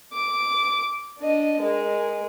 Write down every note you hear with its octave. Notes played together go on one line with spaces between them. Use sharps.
D6
D4 D#5
G#3 A#4